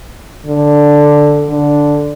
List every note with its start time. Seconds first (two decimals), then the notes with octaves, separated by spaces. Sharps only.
0.46 D3
1.49 D3